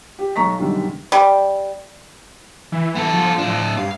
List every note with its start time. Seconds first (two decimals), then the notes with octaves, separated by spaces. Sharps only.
0.19 G4
0.36 B1 A#5 C#6 B6
0.59 F#2 B2 D3 D#3 G3
1.12 G3
2.72 E3
2.95 B3 A4
3.13 F3
3.38 A2 D4
3.77 G2 F5